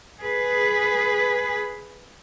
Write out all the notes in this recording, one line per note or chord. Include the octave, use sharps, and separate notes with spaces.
G#4 B4